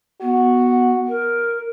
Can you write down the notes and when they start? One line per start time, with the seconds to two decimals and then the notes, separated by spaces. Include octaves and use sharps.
0.22 B3 F#4
1.08 A#4